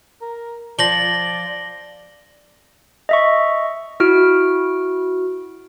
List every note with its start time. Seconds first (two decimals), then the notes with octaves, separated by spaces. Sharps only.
0.21 A#4
0.79 F3 D5 A#6 F#7 G7
3.09 D#5 E5 C#6
4.00 E4 F#4 F6 D7